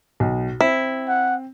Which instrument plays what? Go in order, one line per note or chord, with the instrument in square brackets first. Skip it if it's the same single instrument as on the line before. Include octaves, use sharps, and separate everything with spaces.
[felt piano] B1
[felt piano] C4 [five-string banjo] E4
[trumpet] F#5